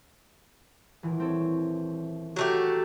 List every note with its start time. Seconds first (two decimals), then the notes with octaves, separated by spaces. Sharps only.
1.03 D#1 E3
1.20 C4 A4 C#5
2.36 F#3 A3 G4